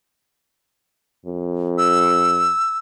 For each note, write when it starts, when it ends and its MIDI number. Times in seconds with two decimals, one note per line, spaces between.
1.26 2.52 41
1.78 2.78 88